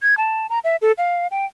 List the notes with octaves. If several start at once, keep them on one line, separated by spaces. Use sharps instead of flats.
G#6
A5
A#5
E5
A4
F5
G5